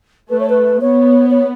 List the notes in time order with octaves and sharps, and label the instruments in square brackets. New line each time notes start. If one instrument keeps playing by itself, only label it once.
[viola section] A3 [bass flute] B4
[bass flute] C#5
B4
[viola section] B3 [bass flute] C#5
[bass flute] C#5